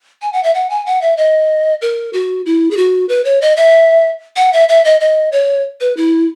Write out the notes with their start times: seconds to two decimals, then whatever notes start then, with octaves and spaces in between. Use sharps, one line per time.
0.22 G#5
0.33 F#5
0.43 E5
0.54 F#5
0.70 G#5
0.86 F#5
1.01 E5
1.17 D#5
1.82 A#4
2.13 F#4
2.46 E4
2.71 G#4
2.77 F#4
3.09 B4
3.25 C#5
3.42 D#5
3.56 E5
4.36 F#5
4.53 E5
4.69 E5
4.85 D#5
5.01 D#5
5.32 C#5
5.81 B4
5.97 E4